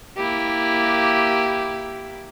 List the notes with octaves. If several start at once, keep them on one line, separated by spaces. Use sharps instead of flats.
A#3 E4 G4